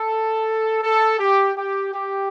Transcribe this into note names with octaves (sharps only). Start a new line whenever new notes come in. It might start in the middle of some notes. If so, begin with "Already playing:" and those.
Already playing: A4
A4
G4
G4
G4